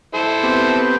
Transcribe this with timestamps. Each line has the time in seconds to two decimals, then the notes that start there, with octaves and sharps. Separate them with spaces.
0.14 E4 A4 C5
0.44 B3 C4 G4